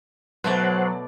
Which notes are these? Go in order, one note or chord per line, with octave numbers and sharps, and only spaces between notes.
B2 F#3 A3 C5 D5 F#5